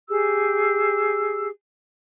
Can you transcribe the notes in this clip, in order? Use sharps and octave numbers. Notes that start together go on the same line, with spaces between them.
G4 G#4 E6